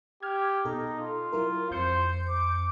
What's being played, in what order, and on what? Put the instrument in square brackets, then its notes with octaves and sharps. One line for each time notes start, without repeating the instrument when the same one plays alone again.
[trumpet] G4 [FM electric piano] F6 G#6
[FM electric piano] B2 A4 [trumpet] D#4
[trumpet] F4
[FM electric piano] F#3 E4 A#4
[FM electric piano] F2 G6 C#7 [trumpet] C5
[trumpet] D6